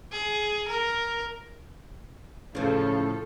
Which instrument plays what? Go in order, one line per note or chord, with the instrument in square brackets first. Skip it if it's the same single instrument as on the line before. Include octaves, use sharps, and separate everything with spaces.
[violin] G#4
A#4
[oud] A2 F3 [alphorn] C#3 [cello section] F4 A4